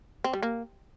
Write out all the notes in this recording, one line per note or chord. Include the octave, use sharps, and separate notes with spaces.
C4
G3
A#3